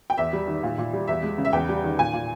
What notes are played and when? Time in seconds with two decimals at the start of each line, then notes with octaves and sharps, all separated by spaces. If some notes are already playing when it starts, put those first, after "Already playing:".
0.10 G5
0.18 E2 E5
0.33 G3
0.48 D#3
0.63 A#2
0.78 A#2
0.93 G3
1.08 E2 E5
1.23 G#3
1.38 C#3
1.45 E5
1.53 E2 G5
1.69 G3
1.84 D#3
1.99 A#2 G#5
2.13 A#2